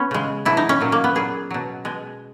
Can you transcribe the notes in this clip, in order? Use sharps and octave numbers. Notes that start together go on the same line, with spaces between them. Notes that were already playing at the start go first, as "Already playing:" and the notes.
Already playing: B3 C#4
C#3 G#3
B2 F#3 E4
D#4
C#4
A#2 F#3
A#3
B3
A#2 F#3 G#4
B2 F#3
B2 G#3